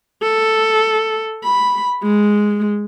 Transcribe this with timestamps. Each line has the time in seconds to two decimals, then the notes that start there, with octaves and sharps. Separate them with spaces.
0.22 A4
1.43 B5
2.03 G#3